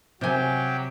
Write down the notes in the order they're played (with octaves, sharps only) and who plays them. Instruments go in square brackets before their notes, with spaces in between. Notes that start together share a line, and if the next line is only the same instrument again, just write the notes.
[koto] C3 G#5 [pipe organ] F#3 G4 G5